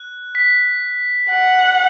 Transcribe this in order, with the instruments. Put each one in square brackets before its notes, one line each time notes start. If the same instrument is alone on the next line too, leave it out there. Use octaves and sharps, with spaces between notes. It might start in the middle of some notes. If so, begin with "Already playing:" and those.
Already playing: [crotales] F#6
B6
[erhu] F#5